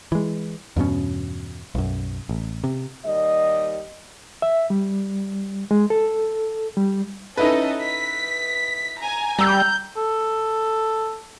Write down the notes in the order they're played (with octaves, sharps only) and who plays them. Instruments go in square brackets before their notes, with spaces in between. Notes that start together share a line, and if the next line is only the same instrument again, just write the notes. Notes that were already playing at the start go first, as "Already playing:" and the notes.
[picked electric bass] E3 G#3
E2 G2 B2 C#4
B1 F#2
A1
C3
[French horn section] D#2 G3 D#5
[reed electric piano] E5
G3
G#3
A4
G3
[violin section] C#4 A4 D#5 [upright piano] D#4 E4 B4
[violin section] B6
G#5 A#5
[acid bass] G3 [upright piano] A#5 E6 [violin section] G6
[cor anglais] A4